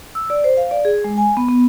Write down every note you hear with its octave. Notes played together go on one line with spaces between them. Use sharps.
E6
D5
C5
F5
D5
G#4
G#3
G#5
B3
B3